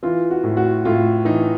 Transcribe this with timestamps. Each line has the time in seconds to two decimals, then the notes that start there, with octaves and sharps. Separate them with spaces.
0.03 E3 F4
0.31 F#4
0.44 A2
0.57 F#4
0.85 A2 F4
1.25 E3 D#4